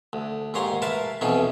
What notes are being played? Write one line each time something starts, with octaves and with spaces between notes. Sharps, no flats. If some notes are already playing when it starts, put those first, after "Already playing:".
D2
D#2 G#2 C#5 A#5 C6
A#4 B4 E5 F5 A5
B1 F2 B2 E3 C#4 D#4